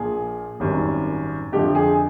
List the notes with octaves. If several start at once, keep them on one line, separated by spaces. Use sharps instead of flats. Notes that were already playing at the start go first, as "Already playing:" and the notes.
Already playing: A#1 A#2 F3 G#4
G#1 F#2 D#3 G3 C4
F2 D3 F3 A3 G4
G#4